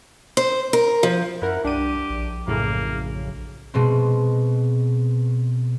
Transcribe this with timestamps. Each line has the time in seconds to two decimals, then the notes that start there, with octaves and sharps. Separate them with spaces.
0.37 C5
0.73 A#4
1.03 F3
1.42 F#2 E4 A#4 F#5
1.65 C2 D4 G4 D#7
2.10 A#1
2.47 F#2 A2 C#3 A#3
3.74 B2 G#3 C4